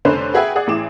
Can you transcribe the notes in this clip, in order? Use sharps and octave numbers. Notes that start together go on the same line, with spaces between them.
F1 D3 C#4 D4 B4 C5
F#4 G#4 B4 E5 F#5 G5
G#4 D5 F#5 D#6
A1 E3 G#4 D6 E7